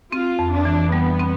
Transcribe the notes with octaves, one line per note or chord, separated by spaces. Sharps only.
C4 F4
F2
D4
E3
G3 B3
C4